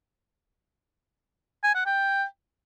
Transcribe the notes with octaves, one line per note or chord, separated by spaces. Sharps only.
G#5
F#5
G5